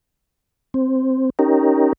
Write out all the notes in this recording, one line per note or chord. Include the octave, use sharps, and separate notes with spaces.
C4
C#4 D#4 G4 A#4